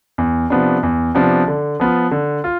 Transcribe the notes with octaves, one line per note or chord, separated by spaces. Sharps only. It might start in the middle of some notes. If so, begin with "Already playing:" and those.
E2
C3 F3 B3 D4
E2
C3 F3 B3 D4
D3
F3 B3 F4
D3
F4